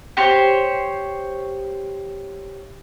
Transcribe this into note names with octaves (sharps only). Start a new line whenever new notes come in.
G4 C5 C#5